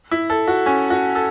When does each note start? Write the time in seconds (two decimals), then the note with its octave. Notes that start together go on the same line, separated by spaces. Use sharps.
0.11 E4
0.30 A4
0.47 F#4
0.66 C#4
0.90 F#4
1.15 A4